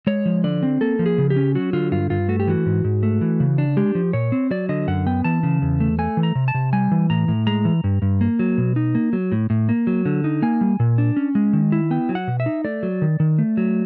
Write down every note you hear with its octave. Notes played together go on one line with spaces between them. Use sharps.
G#3 C#5
F3
D3 D5
C4
A#3 A4
F3
G#4
C#3
G4
C#4
F#3 F#4
D3 F4
G2 F4
G2 F4
A3 F#4
G4
E3 F#4
G#2
G#2
A3
E3
C#3
D4
G#3 G4
F3
A#2 C#5
C4
F#3 D5
D3 D#5
F#2 F#5
B3 G5
E3 A5
C#3
E2
A3
A3 G#5
E3
A#5
C3
A5
C3
G3 G#5
E3
A2 A#5
A2
G#3 A#5
E3
G2
G2
A#3
F#3
B2
D#4
A#3
F#3
A2
A2
A#3
F#3
D3
D#4
A#3 G#5
G3
A#2
D4
C#4
G#3
D#3
E4
B3 G5
F#3
F#5
B2
E5
D#4
A3 D5
F#3
D#3
D#3
A3
F#3